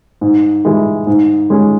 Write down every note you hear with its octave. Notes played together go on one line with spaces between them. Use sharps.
G#2
E3 G#3
G#2
G#3 C#4